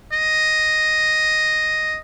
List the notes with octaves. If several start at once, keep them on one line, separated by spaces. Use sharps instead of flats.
D#5